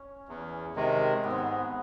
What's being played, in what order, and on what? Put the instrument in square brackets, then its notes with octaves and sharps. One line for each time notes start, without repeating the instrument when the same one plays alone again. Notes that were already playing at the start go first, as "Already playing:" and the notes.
Already playing: [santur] C#4
[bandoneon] E2
C3 D#3 G#3
[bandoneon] G#2 [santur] B3
[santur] C4
B3